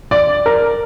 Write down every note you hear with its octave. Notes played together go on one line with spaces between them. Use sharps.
D5
A#4